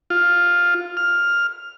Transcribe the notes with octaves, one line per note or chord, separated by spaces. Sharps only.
F4
F6